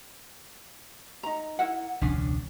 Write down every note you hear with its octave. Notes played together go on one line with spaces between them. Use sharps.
D#4 A#5
E4 A#4 F#5
E1 C#2 C#4 D4